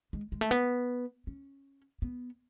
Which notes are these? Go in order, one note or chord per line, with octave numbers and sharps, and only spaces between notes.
G#3
G#3
A3
B3
C#4
B3